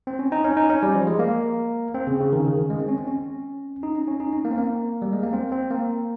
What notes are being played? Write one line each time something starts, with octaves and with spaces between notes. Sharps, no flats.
C4
C#4
D#4
C#4
D#4
C#4
G3
F3
G#3
A#3
C4
C#3
C#3
D#3
C#3
D#3
G#3
C4
C#4
C4
C#4
D#4
C#4
C#4
D#4
C#4
A#3
C4
A#3
G3
G#3
A#3
C4
C4
A#3